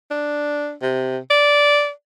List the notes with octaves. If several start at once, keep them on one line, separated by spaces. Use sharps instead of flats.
D4
C3
D5